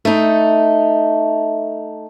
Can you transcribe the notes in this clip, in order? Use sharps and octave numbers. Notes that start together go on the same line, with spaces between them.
A3 D#4